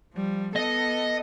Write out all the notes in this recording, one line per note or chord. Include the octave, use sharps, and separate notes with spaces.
F3 G3
B3 A4 D#5